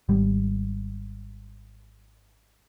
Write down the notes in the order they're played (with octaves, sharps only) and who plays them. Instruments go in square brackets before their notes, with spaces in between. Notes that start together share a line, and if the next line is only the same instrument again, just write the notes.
[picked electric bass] G#1 G3